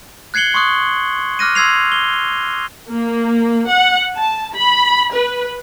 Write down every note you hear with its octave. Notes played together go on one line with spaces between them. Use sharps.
F#6 G#6 C7 C#7 F#7 G7
C6 C#6 D#6 F#6
D6 F6 F#6 A#6 D#7
C6 E6 G#6 C7 F7
G7
A#3
F#5
A5
B5
B4